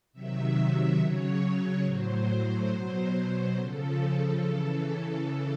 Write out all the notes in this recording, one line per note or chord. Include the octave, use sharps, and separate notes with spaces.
C3 D#3 F#3 E5
C#3 F#3 C#5
C#5
A2 F#3 C5
B2 F#3
C#3 F3 A4
C#3 E3